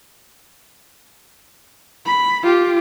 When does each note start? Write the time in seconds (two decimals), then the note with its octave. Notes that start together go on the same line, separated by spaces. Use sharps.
2.06 B5
2.43 F4 G4